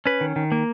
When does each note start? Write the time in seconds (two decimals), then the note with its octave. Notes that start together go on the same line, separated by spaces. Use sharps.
0.06 C#4 B4
0.21 D#3
0.36 D#3
0.52 A#3